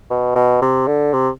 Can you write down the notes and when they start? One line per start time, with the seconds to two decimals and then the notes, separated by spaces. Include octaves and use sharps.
0.10 B2
0.35 B2
0.62 C3
0.87 D3
1.13 C3